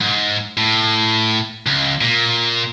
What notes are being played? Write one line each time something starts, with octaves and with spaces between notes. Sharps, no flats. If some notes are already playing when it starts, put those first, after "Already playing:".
G#2
A2
C#2
A#2